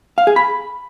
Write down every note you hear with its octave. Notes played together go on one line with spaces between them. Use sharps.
F5
G#4
B5